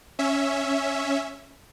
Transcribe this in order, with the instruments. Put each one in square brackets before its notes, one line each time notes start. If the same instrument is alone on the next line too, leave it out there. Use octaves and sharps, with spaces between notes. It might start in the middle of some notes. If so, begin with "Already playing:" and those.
[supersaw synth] C#4 E5